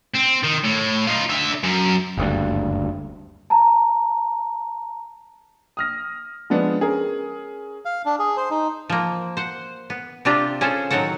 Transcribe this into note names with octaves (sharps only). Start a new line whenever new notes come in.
C4
D#3
A2
D#4 F4
D3 E5
F#2
F#1 D2 G2
A5 A#5
D#6 F6 A#6
F3 G#3 B3 D4
C#4 G#4 A#4
F5
D4
G#4
C5
D#4
F3 A#3
C5 F#5
B3
C3 C4 D4 F4 G4
C#4 F4 G#4 A4 C5
A2 D#3 F#3 C4 A4 F#5